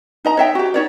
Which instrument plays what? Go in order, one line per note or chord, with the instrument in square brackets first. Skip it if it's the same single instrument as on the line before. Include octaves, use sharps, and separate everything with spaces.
[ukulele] D#4 D#5 A#5
C#5 E5 G5
F#4 G4
D#4 C#5 D5